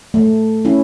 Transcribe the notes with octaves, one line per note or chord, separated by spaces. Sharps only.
A3
C#4 E4